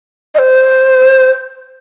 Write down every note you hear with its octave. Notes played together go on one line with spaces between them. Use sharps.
D#5
C5